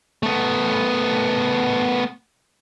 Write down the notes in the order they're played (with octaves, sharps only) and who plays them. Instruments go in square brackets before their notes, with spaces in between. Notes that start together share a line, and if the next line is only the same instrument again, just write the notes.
[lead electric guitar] A3 B3